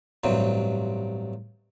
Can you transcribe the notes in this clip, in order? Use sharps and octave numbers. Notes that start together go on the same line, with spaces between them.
A1 G2 C3 F#3